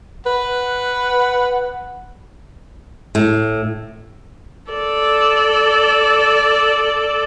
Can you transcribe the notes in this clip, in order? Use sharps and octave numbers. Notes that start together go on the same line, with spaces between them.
B4 F#5
A2
A4 D5